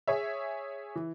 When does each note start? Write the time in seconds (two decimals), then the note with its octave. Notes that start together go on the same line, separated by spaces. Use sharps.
0.08 G#4 C#5 E5
0.95 E3